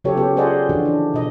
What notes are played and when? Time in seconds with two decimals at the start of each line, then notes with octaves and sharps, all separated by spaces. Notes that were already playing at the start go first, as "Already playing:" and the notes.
0.04 C#3 F#3 F4 G4 A4 C#5
0.17 C#3 B3 G4 A4
0.37 F4 G#4 C5 D5 D#5 F#5
0.69 D3 E3 F3 D4 F#4 A4
0.85 D4
1.14 B2 D#5